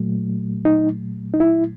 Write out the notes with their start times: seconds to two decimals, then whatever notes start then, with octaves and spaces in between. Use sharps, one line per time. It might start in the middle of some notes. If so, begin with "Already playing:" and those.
Already playing: A#2 F#3 A3
0.65 D#4
1.34 D#4
1.40 E4